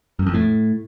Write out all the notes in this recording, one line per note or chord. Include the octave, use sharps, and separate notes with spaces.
F#2
F2
A2